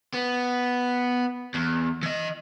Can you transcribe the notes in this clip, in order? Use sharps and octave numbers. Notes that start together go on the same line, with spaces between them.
B3
E2
E3 D#5